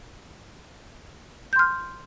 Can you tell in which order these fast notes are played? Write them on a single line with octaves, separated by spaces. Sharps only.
G6 C6 F6